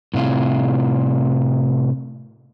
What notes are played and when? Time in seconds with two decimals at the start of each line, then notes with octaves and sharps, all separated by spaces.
0.14 A2 C3 E4 F4